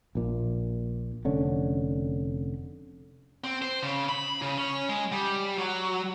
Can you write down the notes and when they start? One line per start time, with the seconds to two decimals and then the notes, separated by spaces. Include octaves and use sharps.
0.15 A#1 A#2
1.25 F1 D3 C#4
3.44 C4
3.62 C5
3.83 C#3
4.09 B5
4.42 C#3
4.58 C#4
4.89 G#3
5.12 G3
5.58 F#3